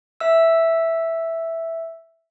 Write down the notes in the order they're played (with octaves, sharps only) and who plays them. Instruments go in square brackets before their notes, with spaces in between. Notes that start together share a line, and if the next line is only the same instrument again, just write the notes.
[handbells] E5 E6